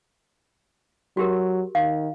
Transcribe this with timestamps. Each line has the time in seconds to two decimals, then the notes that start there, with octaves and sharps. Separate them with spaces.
1.17 F#3 F#4 G4 A#4
1.75 D#3 F5